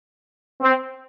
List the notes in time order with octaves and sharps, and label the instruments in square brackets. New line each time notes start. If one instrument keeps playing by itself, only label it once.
[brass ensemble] C4